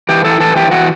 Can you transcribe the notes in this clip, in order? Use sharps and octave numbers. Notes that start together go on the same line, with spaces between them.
E3 G4
E3 A4
E3 A4
E3 G4
E3 F#4